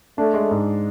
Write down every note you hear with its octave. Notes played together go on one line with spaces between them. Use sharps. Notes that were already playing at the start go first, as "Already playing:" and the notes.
A3 D4
G#3
G#2